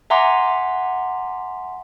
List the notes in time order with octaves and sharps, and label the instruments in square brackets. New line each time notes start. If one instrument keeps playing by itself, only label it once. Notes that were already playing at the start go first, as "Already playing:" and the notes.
[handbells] E5 F#5 G#5 A#5 C6 D6